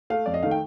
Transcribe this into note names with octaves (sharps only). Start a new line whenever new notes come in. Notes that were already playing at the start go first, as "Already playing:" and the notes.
A3 F5
F2 D5
D#5
D#3 A3 F5
G5